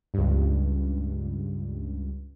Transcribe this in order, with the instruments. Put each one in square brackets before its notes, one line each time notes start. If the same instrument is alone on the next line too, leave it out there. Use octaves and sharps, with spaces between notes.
[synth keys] C#2 G2